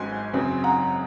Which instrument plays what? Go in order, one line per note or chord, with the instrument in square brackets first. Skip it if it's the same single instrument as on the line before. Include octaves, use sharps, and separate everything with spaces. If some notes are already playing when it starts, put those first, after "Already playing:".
Already playing: [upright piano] G#1 G#2 F#3 C#4 G#5 C6
F#2 C#3 F#3 C4
F#5 A#5